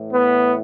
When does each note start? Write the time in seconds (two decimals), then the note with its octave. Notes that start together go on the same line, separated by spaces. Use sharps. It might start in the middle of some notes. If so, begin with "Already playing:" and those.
Already playing: A2 E3
0.11 B3